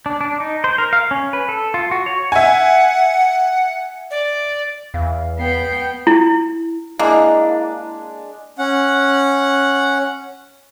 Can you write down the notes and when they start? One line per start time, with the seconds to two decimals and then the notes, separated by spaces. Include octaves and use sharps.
0.06 D4
0.21 D4
0.40 D#4
0.64 C5
0.78 A#4
0.93 F5
1.11 C#4
1.33 B4
1.49 A4
1.74 F4
1.91 F#4
2.06 C#5
2.32 E5 F#5 G#5
4.11 D5
4.94 E2 F5
5.39 B3 G5 C7
6.07 E4
6.99 G#3 A#3 D4 E4
8.58 C#4 F#5